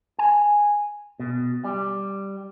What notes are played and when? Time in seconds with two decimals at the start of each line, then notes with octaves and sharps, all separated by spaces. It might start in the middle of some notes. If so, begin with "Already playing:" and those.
0.19 G#5
1.20 B2
1.64 G3